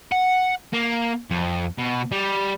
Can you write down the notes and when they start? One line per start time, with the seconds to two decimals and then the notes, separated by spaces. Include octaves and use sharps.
0.12 F#5
0.73 A#3
1.30 F2
1.78 B2
2.12 G3